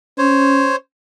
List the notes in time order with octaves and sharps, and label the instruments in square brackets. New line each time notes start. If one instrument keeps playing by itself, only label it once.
[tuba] C#4 [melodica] C5 C#5